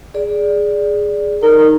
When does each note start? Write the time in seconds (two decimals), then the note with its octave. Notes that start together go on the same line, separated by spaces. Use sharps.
0.14 G#4 D5
1.43 D#4 A#4